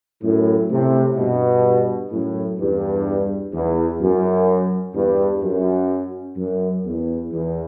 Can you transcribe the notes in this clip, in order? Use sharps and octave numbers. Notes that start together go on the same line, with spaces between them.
F#2 A2
A2 C3
G2 B2
F#2 A2
E2 G2
E2
F#2
E2 G2
F#2
F#2
E2
E2